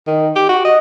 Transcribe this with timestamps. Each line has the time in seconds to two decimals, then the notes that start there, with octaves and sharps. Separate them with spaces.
0.07 D#3
0.36 G4
0.49 F#4
0.65 D#5